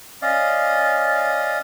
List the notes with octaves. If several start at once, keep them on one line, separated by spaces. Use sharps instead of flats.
C#4 D5 D#5 F5